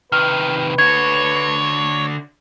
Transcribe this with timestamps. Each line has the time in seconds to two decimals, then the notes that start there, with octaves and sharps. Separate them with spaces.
0.12 C3 D#3 B4 F6
0.79 D3 F#4 C#5 G#6